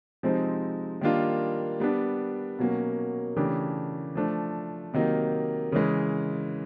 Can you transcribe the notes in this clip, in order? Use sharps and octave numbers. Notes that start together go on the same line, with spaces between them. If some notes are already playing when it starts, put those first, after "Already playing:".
C3 F3 G#3 C4 D#4
D#3 G3 A#3 D4 F4
G3 B3 D4
B2 F#3 A#3 C#4
C#3 E3 A3 D4 G4
F3 A3 D4
C3 D#3 F#3 A#3 D#4
C#3 E3 G#3